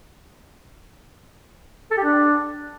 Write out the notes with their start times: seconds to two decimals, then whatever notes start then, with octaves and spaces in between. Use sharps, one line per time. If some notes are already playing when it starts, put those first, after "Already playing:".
1.91 A4
1.97 G4
2.04 D4